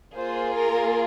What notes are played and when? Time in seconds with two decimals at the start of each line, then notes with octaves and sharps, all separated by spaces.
0.15 A#3 F4 G#4 C5
0.55 A#4